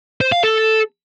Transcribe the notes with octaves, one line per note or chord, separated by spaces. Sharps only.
C5
F5
A4